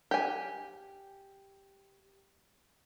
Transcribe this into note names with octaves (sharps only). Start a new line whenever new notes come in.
G4 G#5